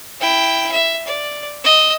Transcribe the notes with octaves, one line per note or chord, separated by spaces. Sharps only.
E4 G5
E5
D5
D#5 E6